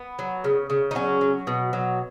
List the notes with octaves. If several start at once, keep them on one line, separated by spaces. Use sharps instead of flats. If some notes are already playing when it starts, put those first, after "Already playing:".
Already playing: B3
F#3
C#3
C#3
D#4
F#3 C#4
F#3
B2
F#3